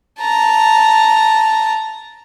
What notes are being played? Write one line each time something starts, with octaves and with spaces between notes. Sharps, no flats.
A5 A#5